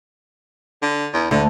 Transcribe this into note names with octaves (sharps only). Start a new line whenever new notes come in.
D3
E2
D2 D3